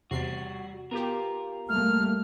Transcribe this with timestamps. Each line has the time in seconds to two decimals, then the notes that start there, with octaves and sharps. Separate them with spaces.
0.11 E2 C3 G3 F#4 C7
0.91 B3 F4 G4 A#4
1.69 G3 A3 A#3 F6